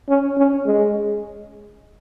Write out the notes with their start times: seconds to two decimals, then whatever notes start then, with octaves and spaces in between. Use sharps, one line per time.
0.09 C#4
0.38 C#4
0.66 G#3